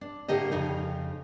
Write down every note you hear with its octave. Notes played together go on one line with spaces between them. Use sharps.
D4
A2 D3 A#3 G4 D#5
F2 C#3 D#4